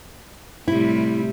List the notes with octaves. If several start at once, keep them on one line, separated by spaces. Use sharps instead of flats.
A2 C3 G3 E4